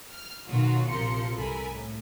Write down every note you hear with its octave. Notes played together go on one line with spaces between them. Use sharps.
F6
B2 D#3 F#3 F4 F#4
A#1 C3 F3 A#4 C6 C#7
C2 E3 A4 A#4 G#5 B5
A2